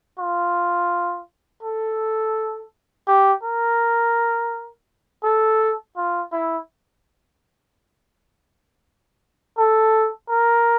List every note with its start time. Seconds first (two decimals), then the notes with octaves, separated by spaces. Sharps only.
0.19 F4
1.63 A4
3.08 G4
3.43 A#4
5.24 A4
5.97 F4
6.32 E4
9.58 A4
10.30 A#4